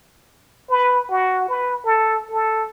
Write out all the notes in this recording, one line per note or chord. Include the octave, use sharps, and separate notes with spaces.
B4
F#4
B4
A4
A4